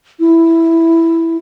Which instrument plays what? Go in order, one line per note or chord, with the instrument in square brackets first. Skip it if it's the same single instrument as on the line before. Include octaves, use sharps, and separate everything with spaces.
[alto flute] E4